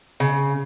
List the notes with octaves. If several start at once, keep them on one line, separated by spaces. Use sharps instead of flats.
C#3